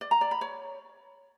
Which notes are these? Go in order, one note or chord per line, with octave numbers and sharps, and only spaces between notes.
D5
A#5
D5
B5
C#5